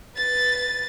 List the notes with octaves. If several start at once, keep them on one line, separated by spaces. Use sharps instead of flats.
B4 A6